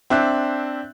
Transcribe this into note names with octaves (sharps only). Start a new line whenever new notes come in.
C4 D4 E5 F#6